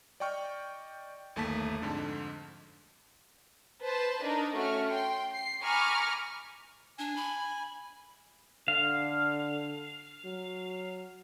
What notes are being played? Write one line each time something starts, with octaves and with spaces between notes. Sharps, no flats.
D5 D#5 G5 C#6 F6 G6
G1 D#2 A3 A#3 A5 B6
F2 G#2 D3
B4 C5 A5
D4 D#4 A#4
A3 C#4 F#4 C#6 F6
G5 C6
C7
G#5 A#5 B5 C#6 D6 F6
D4 G#5
B5
D3 F5
F#3